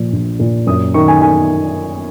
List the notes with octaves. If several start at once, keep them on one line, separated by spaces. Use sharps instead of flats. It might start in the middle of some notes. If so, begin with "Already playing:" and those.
Already playing: A#2 F3
A#1
A#2
F#2 D#6
D#3 C#6
G#5
D#3 G#5